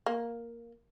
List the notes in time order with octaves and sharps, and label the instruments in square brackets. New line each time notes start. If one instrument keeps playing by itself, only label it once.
[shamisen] A#3